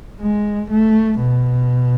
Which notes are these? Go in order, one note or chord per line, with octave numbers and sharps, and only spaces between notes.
G#3
A3
B2